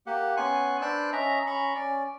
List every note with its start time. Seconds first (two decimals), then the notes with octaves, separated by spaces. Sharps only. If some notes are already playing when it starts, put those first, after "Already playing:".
0.06 A#3 G4 F#5
0.37 B3 C#4 G#5 C6 C#6 F#6
0.81 D4 B4 C5 D5 E6 F#6
1.13 C#4 D#5 E5 A#5
1.47 C#4 A#5 B5 C#6
1.75 C#4 D5